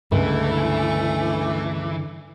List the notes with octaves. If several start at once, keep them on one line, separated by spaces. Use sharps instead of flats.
C#2 G2 D3 E3 A3